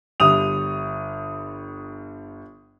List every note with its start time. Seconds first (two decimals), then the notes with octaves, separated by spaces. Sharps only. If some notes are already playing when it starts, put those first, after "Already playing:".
0.20 G1 G3 D#6 F7